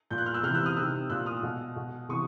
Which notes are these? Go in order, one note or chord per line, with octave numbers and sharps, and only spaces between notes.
A#2 G6
F#6
F6
E6 F#6
C3 F6 G6
E3
E6 F#6
D#6 F6
C3 D#3 E6 F#6
A#2 E6 F#6
D#6 F6
B2
B2
C3 E3 C#6 D#6